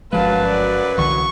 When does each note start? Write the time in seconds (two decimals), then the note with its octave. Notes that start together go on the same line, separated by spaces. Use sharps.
0.13 G1 F#2 F3 F#3 G#3 B4 F5 A5
0.48 D5
0.98 C2 D3 E3 C#6